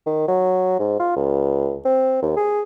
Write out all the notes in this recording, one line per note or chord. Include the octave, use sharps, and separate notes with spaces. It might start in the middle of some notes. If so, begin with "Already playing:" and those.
D#3
F#3
G#2
F4
C#2
C4
D#2
G#4